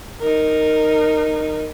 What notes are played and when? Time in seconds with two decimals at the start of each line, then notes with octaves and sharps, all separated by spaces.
0.21 D#4 A#4